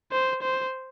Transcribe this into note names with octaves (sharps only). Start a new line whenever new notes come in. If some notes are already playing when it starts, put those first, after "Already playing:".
C5
C5